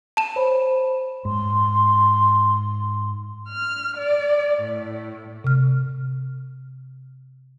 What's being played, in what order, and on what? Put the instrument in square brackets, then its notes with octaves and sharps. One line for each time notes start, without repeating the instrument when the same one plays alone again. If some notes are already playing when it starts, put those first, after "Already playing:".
[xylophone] A5 E7
[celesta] C5 C#5 B5
[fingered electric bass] G#2 [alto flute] C6
[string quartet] F6
D5
A2
[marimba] C3 F6